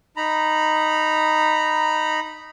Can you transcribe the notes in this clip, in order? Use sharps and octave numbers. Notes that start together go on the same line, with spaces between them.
D#4 A#5 B5